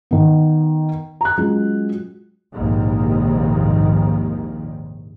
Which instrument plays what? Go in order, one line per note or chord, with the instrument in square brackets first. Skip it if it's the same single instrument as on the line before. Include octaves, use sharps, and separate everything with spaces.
[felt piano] D#3 B3
A#5 F#6
F#3 G#3 C#4 F4 G#4
[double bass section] A#1 D#2 G#2 C3 D#3